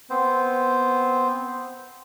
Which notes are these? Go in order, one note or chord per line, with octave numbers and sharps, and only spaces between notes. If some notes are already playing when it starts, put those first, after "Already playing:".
B3 C4 C5